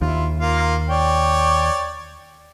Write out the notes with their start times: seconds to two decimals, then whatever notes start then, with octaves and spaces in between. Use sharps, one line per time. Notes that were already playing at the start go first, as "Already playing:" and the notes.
0.01 D#2 E4 F4
0.40 A#3 F4 F5
0.89 C#5 D5 G5